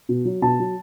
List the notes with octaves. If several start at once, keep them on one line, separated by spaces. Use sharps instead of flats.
B2
F#3
B2 A5
F#3